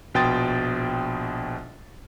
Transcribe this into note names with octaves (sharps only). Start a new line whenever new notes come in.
A#1 B2 G5 C6 D#6 A6